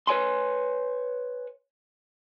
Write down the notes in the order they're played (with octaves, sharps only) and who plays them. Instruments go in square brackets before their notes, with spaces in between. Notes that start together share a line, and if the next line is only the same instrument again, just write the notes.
[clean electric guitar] B4 C#5 G#5 C6